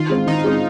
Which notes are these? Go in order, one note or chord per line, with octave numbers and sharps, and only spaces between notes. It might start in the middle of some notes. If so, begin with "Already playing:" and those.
Already playing: D#3 F4
G#3 C4
D#3 D#4
G#3 C4